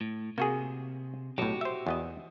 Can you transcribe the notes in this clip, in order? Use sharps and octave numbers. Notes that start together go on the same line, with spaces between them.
A2
C3 A#3 F#4 G#4
B1 A2 F#4 G4
C5 E5
E2 B3 D#5